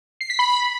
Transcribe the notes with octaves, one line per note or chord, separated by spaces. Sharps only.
C7
B6
B5